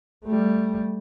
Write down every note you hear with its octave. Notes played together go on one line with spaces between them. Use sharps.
G3 A3